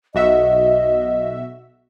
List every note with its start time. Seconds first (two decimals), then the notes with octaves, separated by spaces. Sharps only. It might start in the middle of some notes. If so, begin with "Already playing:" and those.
0.15 B1 F#4 D#5 E5